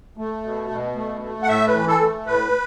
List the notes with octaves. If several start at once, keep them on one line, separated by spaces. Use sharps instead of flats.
A3
B2
B2
A3
A3
F#5
A2 E5
B4
E3
A4
A3
A2 B4